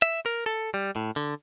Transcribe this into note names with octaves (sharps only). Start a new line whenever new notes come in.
E5
A#4
A4
G3
A2
D3